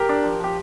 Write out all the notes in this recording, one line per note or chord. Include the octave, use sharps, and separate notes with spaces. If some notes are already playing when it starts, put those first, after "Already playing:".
Already playing: G4 A#4
D4
F3
F3 G4